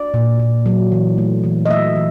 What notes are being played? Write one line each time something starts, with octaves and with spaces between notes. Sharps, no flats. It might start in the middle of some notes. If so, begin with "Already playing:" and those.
Already playing: D5
A#2
A#2
F#3
E3
A3
E3
D#5
A3 E5
E3